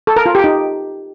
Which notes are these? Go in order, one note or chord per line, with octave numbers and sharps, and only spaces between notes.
A4
A#4
F4
G4
D#4